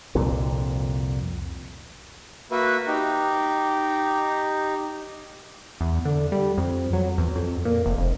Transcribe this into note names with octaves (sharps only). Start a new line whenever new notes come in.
C2 F2 A#2 D3
A#3 F#4 B4 E5
D#4 G4
E2
D3
G3
F2
F#3
E2
F2
A#2
F1
F1